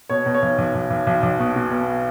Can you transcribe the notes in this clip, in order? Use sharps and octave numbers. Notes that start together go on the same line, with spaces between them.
B2 C#5
B2
C#5
B1
B1
B1
B1
B1
B1
B2
B2
B2